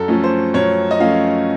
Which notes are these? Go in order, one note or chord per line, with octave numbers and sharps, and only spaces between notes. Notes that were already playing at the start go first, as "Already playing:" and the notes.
Already playing: F#2 A4
F3 A3 C#4
C5
F#2 C#5
D#5
F3 A3 C#4 F5